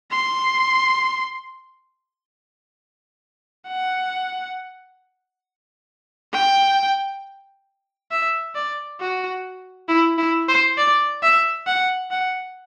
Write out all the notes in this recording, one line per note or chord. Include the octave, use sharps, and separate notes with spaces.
C6
F#5
G5
E5
D5
F#4
E4
E4
C5
D5
E5
F#5
F#5